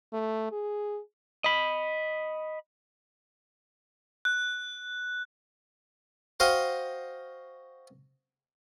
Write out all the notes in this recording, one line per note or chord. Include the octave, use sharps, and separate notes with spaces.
A3
G#4
D#5 B5
F#6
F#4 C5 D#5 F5 G5